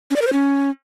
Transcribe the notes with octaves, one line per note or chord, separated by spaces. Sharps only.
C#4
D5
A#4
C5
C#4